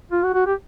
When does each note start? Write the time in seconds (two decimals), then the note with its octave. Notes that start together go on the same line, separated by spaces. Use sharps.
0.11 F4
0.23 F#4
0.34 F#4
0.46 G4